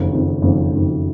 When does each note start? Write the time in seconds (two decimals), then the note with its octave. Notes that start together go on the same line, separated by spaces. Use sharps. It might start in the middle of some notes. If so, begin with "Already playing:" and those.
Already playing: F#1 F2 D#3
0.13 F#1 F2 D#3
0.42 F#1 F2 D#3
0.72 F#1 F2 D#3